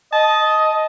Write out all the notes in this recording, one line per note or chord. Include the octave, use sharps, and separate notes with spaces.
D#5 A5